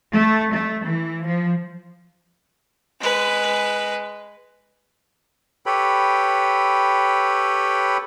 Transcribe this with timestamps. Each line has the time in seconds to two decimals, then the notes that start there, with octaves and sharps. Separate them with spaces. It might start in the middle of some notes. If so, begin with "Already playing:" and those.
0.12 A3
0.51 A3
0.82 E3
1.23 F3
3.00 G#3 B4
5.66 G4 A4 B4 C#5 G5 B5